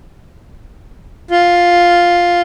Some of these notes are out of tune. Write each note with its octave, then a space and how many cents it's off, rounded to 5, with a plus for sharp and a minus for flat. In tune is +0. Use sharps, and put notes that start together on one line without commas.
F4 +5